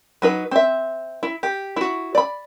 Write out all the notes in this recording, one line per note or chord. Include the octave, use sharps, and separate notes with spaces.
F#3 D#4 B4
C4 E5
E4
G4
E4 F#4
D5 B5